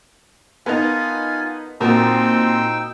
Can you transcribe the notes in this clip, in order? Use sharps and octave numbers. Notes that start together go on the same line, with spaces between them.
B3 D#4 F4 A#4 G#5 A5 F6
A#2 C4 D#4 F#4 A#4 G5 A5 E6